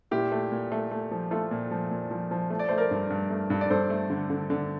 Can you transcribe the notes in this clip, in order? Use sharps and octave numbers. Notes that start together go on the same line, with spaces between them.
A#2 E4 G4
A3
A#2
A3
A3
F3
A3 F4 A4
A#2
F3
A#2
F3
F3
A3
D5
A3 C5
A#4 D5
G2
G2
A3
G2
D5
G2 A4 C5
A3
D3
D3
D3